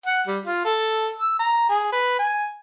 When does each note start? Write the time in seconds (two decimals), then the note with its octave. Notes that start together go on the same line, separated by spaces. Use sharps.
0.06 F#5
0.27 G3
0.46 F4
0.65 A4
1.19 E6
1.39 A#5
1.69 G#4
1.92 B4
2.19 G#5